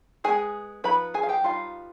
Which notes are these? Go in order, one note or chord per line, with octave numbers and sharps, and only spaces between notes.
G#3 B3 D4 G#4 G#5
F3 B3 D#4 B4 B5
G#4 G#5
F5
G4 G5
G3 B3 D#4 F4 F5